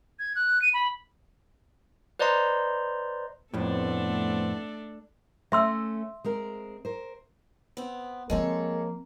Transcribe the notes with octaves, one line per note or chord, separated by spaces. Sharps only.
G#6
F#6
D#7
B5
B4 C5 D5 D#5 A#5 C6
F2 A2 A3 B3 C4 D4 A4
A3 C#4 E5 C6 E6
G#3 C4 A#4
A#4 C5
B3 C4
F3 G#3 A#3 C4 A4 C#5